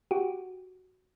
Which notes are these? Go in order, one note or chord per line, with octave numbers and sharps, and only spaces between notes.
F#4 G4